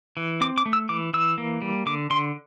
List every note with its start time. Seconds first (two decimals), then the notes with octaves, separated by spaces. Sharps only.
0.17 E3
0.41 C4 D6
0.58 D6
0.66 A3
0.73 E6
0.89 E3 D6
1.14 E3 E6
1.38 A#3
1.62 G3
1.86 D3 D6
2.10 D3 C6